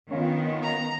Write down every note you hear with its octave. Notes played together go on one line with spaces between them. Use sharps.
D#3 B3 C#4 F4
A#5